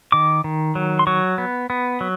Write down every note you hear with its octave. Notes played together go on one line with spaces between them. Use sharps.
D#3 D6
D#3
F#3
C6
F#3 C#6
B3
B3
F#3